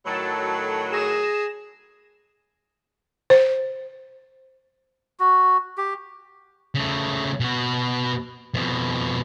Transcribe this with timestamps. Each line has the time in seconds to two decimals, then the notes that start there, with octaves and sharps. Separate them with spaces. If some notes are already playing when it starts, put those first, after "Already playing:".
0.06 A2 D#3 F#3 A4 A5
0.92 G#4 A#6 E7
3.30 C5
5.20 F#4
5.78 G4
6.75 C#3 A3
7.40 B2 F#4
8.54 F2 B2